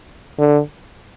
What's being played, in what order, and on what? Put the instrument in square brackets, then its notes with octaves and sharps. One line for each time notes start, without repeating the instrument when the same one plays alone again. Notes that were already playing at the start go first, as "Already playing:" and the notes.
[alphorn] D3